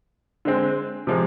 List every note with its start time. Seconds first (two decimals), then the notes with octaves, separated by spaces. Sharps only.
0.45 D3 G#3 C4
1.07 C3 F3 G#3